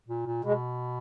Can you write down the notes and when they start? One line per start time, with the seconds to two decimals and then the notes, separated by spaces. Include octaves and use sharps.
0.08 A#2
0.26 A#2
0.44 B2 G#3